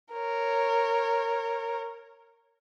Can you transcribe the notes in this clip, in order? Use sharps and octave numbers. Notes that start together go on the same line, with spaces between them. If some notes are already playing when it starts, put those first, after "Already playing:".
A#4 C#5